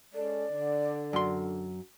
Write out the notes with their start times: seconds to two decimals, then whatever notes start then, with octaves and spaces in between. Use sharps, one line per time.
0.14 G#3 C#4 A4 D5
0.51 D3
1.13 F#2 C6